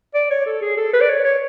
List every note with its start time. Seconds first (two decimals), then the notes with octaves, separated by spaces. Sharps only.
0.14 D5
0.30 C#5
0.46 A4
0.61 G#4
0.77 A4
0.93 B4
1.01 D5
1.09 C#5
1.25 C#5